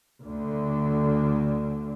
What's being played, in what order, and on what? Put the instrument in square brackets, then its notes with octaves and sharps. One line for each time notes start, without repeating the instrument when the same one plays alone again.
[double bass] D2 D3